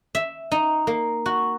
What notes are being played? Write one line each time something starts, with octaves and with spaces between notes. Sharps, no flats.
E5
D#4
A#3
F#4